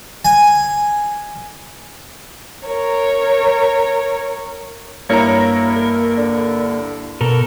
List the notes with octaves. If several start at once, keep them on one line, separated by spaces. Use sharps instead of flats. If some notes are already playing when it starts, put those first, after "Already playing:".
G#5
A#4 C#5
G2 A#3 E4 A#4 C#5 A#5
A#4
D3
B2 A4 A#4